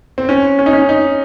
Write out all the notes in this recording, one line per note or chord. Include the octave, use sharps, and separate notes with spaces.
C4
C#4
C#4
D#4
C#4
D#4